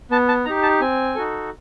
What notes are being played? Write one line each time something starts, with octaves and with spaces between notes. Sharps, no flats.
B3 A5
A5
D#4 G4 A#5
A5
C4 G#5
D#4 F#4 A4